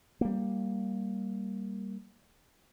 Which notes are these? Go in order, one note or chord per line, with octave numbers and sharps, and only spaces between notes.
G3 A#3